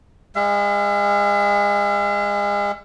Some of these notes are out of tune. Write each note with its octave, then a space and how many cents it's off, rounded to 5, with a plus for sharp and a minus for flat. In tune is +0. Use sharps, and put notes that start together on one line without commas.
G#3 -30 E5 +45